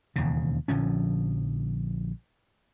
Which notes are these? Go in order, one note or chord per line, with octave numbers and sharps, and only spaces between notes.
E1 D#2 C#3
A#1 D3 F3 C#4